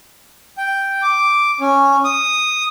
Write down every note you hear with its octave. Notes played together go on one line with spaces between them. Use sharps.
G5
D6
C#4
D#6